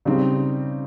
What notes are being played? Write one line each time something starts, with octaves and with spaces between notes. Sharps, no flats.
C#3 G3 C4 D#4